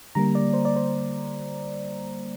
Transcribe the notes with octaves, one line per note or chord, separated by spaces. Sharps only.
D3 G3 A#3 A#5
D5
C5
D5
C5